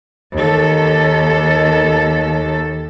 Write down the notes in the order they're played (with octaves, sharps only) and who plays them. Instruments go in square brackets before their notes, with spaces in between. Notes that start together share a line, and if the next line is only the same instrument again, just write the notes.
[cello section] D#2 A4